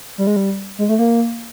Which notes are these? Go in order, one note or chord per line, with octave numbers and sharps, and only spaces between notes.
G3
G#3
G3
G#3
A3
A#3